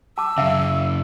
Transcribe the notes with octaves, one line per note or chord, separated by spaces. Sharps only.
A5 D6 E6
F#2 C#3 E5 F5